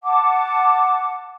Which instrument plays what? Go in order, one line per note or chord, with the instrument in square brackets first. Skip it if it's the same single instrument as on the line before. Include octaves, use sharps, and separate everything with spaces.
[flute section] F#5 A5 D6